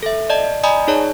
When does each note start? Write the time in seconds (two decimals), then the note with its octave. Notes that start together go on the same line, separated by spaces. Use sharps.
0.03 A4 E5
0.30 D5 D#5 A5
0.63 D5 D#5 G#5 A#5 B5 D#6
0.87 D#4 G#4 C#5 D5 A5